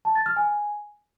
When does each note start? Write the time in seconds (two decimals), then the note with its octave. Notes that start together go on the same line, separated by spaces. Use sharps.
0.05 A5
0.15 A6
0.26 F6
0.36 G#5